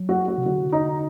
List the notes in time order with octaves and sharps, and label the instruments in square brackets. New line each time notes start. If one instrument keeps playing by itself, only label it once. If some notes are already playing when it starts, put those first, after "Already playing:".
Already playing: [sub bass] F#3
[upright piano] F#4
F#4
[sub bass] C3
[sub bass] D3 [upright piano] F#4
[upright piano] D#4